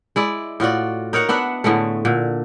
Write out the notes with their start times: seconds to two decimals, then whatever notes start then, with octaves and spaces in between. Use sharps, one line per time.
0.16 G#3 E4 D5
0.60 A2 F4 F#4 D5
1.13 D#4 A#4 C#5 F#5
1.29 B3 D4 E5 F#5
1.64 A2 D3 G#3 A3
2.05 A#2 D3